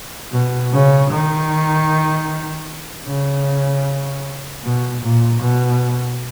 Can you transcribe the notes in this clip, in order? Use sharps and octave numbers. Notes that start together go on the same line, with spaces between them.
B2
C#3
D#3
C#3
B2
A#2
B2